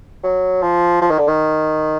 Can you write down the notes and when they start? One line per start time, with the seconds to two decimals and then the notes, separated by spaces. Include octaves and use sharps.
0.24 F#3
0.63 F3
1.02 F3
1.10 D#3
1.19 D3
1.28 D#3